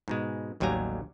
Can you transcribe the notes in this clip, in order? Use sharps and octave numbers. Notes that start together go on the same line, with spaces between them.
G#2 B2 G#3
A1 D#2 F#3 G3 G#5 A#5